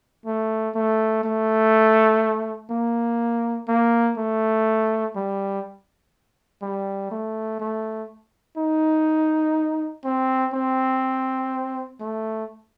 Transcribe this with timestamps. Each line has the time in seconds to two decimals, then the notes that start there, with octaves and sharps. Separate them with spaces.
0.25 A3
0.75 A3
1.24 A3
2.71 A#3
3.68 A#3
4.18 A3
5.16 G3
6.62 G3
7.11 A3
7.60 A3
8.57 D#4
10.04 C4
10.54 C4
12.00 A3